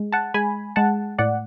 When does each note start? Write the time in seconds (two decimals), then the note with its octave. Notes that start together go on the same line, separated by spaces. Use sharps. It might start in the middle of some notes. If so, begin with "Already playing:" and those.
Already playing: G#3
0.12 F#5 A5
0.34 G#3 G#5 B5
0.76 G#3 F#5 A5
1.18 A2 D5 F#5